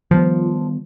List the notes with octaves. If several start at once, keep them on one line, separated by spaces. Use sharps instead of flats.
D#3 F3 G3 B3